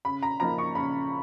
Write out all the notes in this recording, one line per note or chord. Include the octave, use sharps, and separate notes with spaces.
C#3 B5
A#5
F3 A#3 D#4 A#5
C#6
C#3 B5